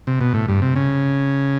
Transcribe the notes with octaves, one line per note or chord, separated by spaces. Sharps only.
C3
B2
A2
G2
C3
C#3